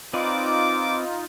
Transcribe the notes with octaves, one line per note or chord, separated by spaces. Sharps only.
C4 D#4 F4 B4 D5 D6